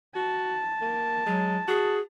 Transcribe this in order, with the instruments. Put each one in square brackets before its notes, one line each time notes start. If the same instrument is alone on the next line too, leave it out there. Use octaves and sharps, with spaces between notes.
[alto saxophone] F#4 [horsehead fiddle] A5
[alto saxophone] A#3
[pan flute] F#3 [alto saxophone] G#3
[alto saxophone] F#4 [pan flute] G#4